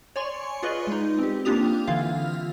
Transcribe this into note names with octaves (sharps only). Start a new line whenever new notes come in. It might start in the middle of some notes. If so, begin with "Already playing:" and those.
C#5 D5 G#5 C6 C#6
F4 G#4 B4 D5 D#5
G#3 D#4
C4 G4
A#3 D4 F4 G4 D#6 F7
D3 E3 E4 F4 F5